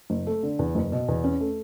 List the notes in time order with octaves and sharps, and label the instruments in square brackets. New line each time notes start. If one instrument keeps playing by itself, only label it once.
[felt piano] F#1
A3
D3
E2
F#1
B2
E2
C#4
A3